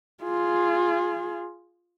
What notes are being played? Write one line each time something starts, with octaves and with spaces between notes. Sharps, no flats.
F4 G#4